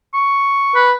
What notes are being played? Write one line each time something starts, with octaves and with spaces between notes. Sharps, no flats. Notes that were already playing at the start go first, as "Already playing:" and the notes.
C#6
B4